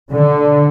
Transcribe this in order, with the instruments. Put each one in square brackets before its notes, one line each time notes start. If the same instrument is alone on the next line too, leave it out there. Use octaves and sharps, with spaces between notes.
[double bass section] D3